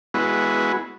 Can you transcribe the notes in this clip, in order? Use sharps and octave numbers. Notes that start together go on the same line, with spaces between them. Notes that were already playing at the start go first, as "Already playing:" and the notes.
G#3 B3 E4 F#4